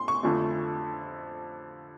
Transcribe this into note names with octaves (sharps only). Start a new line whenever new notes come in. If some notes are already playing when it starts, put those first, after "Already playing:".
Already playing: A2 C6
C#6
F2 D3 F3 A3